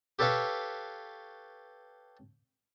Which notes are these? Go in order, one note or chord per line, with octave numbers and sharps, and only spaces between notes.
G4 A4 B4 C#5 F5 A5